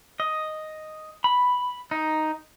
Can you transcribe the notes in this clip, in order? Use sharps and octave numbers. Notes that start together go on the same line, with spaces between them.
D#5
B5
D#4